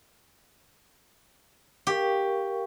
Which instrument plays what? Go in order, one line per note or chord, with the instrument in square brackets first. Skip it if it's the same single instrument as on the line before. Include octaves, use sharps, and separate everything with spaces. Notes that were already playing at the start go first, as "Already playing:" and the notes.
[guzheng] G4 [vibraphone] A#4 F5 C#6